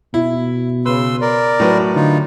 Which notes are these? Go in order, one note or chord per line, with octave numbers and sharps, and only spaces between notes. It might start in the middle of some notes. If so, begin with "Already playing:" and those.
B2 E4
C#3 B4 C6 E6
A#4 D5
A2 F#3 B4
D3 D#4 F4